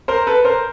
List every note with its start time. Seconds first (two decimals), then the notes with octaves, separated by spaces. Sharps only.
0.08 A#4 C5
0.27 A4 B4
0.45 A#4 C5